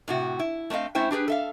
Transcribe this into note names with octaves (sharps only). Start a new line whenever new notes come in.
A2 C3 F#4
E4
A3 B3 C4 D#5 F5
A3 C#4 E4 C5 G5
D4 G4 G#4 B4
A4 E5 F5